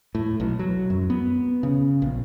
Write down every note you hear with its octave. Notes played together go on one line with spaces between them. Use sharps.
A2
B1
F#3
F#2
B3
C#3
A#1